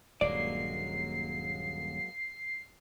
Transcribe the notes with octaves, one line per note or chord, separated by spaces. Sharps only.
D#1 G2 F#3 G#3 A#3 D5 C7